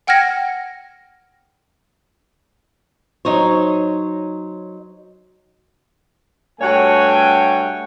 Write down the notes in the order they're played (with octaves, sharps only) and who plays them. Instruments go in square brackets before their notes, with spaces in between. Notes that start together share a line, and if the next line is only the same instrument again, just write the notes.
[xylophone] F#5 G5 F6 G#6 A#6 C#7
[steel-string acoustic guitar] F#3 D#4 C5 C#5
[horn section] G2 A3 F#4 C#5 G5 G#5